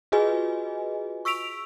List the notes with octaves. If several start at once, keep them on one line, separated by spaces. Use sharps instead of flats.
F4 F#4 G#4 B4 D#5 G#5
C#6 E6 B6 D7 F7